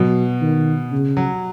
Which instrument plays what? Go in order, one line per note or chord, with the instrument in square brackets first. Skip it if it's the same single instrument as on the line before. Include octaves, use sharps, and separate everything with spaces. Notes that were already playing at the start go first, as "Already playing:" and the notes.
Already playing: [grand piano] B2 [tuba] F#3
[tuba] D#3
C#3
[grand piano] F#3